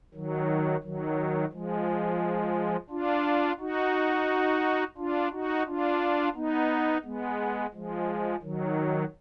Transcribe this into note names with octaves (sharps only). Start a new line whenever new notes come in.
D#3 F#3
D#3 F#3
F3 G#3
D4 F4
D#4 F#4
D4 F4
D#4 F#4
D4 F4
B3 D#4
G#3 B3
F3 G#3
D#3 F#3